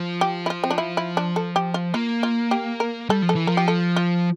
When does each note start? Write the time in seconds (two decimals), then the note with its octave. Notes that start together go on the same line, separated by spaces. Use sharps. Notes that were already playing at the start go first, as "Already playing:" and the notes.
Already playing: F3
0.21 G4
0.46 E4
0.50 F4
0.64 C4
0.71 D4
0.78 E4
0.97 E4
1.17 D4
1.36 A4
1.56 G4
1.74 F4
1.94 A#3 F4
2.23 F4
2.51 G4
2.80 A#4
3.09 G3 A4
3.22 F3
3.29 A4
3.35 E3
3.47 F3 A#4
3.57 G4
3.68 A4
3.96 F4